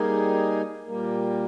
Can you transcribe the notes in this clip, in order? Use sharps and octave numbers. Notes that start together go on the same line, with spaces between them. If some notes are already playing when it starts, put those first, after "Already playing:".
Already playing: G3 A#3 D#4 G#4
A#2 G3 A#3